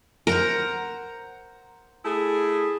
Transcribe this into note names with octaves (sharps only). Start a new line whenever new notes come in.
A#4 C5 F#5 A#5
A3 E4 G#4